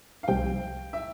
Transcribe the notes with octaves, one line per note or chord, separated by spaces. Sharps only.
F5
C2 C3 F3 G5
E5